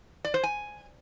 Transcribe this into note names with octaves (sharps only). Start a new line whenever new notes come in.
D5
C5
G#5